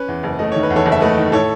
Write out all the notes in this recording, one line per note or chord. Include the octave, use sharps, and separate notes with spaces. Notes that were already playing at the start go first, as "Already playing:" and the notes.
Already playing: C#4 B4
E2
F#1
A3 D#5
D#3 C#5
B4
E2
A4 C#5
F#1
E5
A3 B4 D#5
D#3
A2 A4 C#5